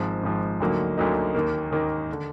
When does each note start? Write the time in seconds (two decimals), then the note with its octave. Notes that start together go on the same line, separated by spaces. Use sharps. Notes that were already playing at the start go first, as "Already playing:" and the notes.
Already playing: G#1 G#2 F3
0.23 G#1 G#2 F3
0.60 D2 D3 F#3 A#3 D#4
0.98 D2 D3 F#3 A#3 D#4
1.35 D#2 D#3 A#3
1.71 D#2 D#3 A#3
2.12 D3